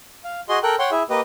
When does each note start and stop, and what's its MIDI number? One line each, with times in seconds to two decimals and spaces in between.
0.24 0.40 77
0.49 0.59 66
0.49 0.59 68
0.49 0.59 75
0.49 0.59 84
0.63 0.76 69
0.63 0.76 70
0.63 0.76 79
0.63 0.76 90
0.79 0.90 73
0.79 0.90 78
0.79 0.90 79
0.79 0.90 84
0.91 1.03 64
0.91 1.03 68
0.91 1.03 76
1.10 1.21 58
1.10 1.21 67
1.10 1.21 71
1.10 1.21 75